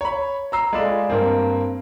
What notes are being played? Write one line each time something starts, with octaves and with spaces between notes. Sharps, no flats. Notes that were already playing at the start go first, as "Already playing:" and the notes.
C#5 B5
A#5 E6 C7
G#3 F4 A4 D5 B5 E7
G2 A#3 C4